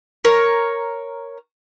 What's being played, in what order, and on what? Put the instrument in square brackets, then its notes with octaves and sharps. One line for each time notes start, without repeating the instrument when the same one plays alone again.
[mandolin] A#4 C#5